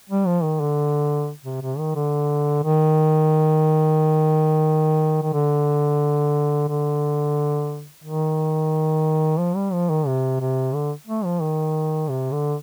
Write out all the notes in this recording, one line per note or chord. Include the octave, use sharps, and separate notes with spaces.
G3
F3
D#3
D3
C3
C3
D#3
D3
D#3
D#3
D3
D3
D#3
F3
G3
F3
D#3
C3
C3
D3
A3
F3
D#3
C3
D3